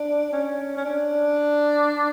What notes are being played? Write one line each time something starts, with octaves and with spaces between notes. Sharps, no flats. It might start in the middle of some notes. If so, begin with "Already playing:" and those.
Already playing: D4
C#4
C#4
D4